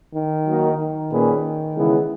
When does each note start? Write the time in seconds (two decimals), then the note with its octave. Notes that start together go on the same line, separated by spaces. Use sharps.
0.14 D#3
0.45 F#3 A#3 D#4 F#4 A#4
0.78 D#3
1.10 A#2 A#3 C#4 G#4 B4
1.74 C#3 E3 G#3 B3 E4